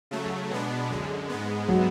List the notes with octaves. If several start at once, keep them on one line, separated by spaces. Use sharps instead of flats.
C#3 F#3 A3
B2 G#3 B3 D4
F#2 D3 G#3
G#2 G#3 B3
F#3